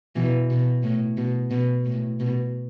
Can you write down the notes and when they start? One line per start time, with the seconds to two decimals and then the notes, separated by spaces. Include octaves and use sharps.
0.16 B2 E3
0.51 B2
0.83 A2
1.17 B2
1.51 B2
1.85 A2
2.20 B2